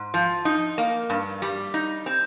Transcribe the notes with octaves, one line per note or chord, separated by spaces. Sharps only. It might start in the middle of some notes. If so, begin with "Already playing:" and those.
Already playing: G#2
F3
D#4
A#3
G2
G3
D#4
C4